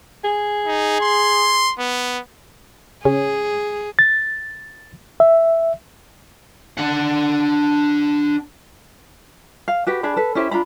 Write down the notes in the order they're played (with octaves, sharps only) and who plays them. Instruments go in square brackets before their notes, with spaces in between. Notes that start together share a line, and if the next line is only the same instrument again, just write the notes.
[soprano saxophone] G#4
[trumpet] D#4
C6
B3
[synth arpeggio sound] C#3 C#4 [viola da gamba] G#4
[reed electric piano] A6
E5
[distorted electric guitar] D4 F#5
[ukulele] F5
F#4 G4 B4
D4 G#4 B5
A4 B4
C#4 E4 G4 C5
D4 F4 A#5 B5